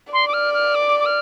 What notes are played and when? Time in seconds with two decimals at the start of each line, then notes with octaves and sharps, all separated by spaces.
0.13 D5 C6
0.28 D6
0.33 F6
0.54 F6
0.75 D6
0.99 D6
1.06 F6